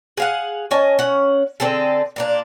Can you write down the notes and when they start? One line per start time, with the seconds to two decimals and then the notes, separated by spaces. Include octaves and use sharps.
0.17 G#4 F5 F#5
0.71 C#4 D#5 G#5 A5
0.99 C#4 F#5
1.60 D3 C4 G#4 A4
2.16 A#2 A#3 D4